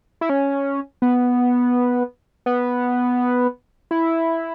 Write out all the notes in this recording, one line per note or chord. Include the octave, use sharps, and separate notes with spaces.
E4
C#4
B3
B3
E4